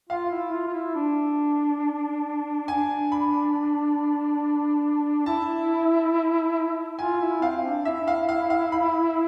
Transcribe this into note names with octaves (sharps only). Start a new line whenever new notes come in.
F4 F5
E4
F4
F4
E4
D4
D4 G#5
B5
E4 A5
F4 G#5
E4
C4 F5
D4
E4 E5
F5
F5
F5
B5